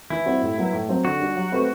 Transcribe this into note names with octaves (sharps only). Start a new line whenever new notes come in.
E3 E4
G3 C4 F#4
A2
F#3 B3 F#4
A2
F#3 C4
D3 F#4
G3 D4
F#3
A3 C4 G4 B4